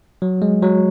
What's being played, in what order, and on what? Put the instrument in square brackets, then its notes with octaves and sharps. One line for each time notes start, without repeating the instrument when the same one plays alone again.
[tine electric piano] F#3
G#3
F#3